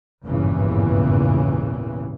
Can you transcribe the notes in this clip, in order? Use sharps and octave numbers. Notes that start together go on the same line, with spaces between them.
G#1 E2 G2 A#2 C#3 E3